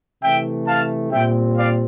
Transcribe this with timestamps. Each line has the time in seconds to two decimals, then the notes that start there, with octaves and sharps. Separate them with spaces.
0.23 C3 E3 A3 E5 G5
0.67 F5 A5
1.11 A#2 G3 C4 E5 G5
1.55 D5 F5